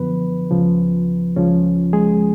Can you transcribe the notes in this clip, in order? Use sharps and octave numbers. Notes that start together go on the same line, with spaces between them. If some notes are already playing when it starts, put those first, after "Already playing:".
Already playing: F#2 D3 F3 B3 B4
C#2 C#3 F3
C#2 C#3 F3 C#4
G#3 G#4